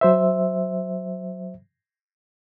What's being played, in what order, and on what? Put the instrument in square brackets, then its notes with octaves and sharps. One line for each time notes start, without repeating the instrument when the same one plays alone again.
[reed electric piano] F#3 C5 E5